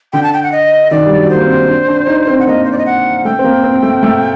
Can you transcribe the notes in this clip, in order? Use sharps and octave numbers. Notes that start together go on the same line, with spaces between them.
D3 G5
A5
G5
F#5
D#5
D#3 D5
G3
F#3
A#3 C5
C4
D4
D4
D#4
C4
F#5
A#3 D#5
C5
D5
D#5
F#5
A3 G5
C4
A#3
C4
A3
A3